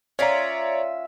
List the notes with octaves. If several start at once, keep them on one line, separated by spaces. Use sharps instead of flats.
C#4 F4 C#5 D5 E5 A#5